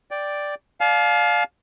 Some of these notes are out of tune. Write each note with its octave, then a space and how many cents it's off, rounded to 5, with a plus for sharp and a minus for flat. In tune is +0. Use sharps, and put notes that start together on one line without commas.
D5 +0 G5 +0
D5 +0 F5 +15 A5 -45